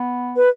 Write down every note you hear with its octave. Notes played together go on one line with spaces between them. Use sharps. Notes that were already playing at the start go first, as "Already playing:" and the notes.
Already playing: B3
B4